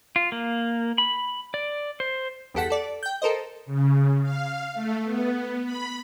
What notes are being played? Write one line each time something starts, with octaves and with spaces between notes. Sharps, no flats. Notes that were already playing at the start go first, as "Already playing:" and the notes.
F4
A#3
B5
D5
C5
G1 E2 G4 A4 F#5 B6
A4 D5
G5 G6
A4 A#4 C5 D#5
C#3
F5
A3
B3
B5